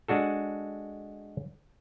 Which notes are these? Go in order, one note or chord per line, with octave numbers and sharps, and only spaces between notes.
G#3 D4 F#4 A4